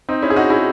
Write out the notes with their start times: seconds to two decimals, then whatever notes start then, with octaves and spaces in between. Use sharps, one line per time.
0.09 C4 D#4
0.22 C#4 E4
0.30 G#4
0.36 D#4 F#4
0.50 E4 G#4